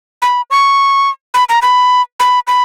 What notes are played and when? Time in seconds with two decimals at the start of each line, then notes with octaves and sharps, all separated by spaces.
0.22 B5
0.51 C#6
1.34 B5
1.49 A#5
1.62 B5
2.20 B5
2.47 B5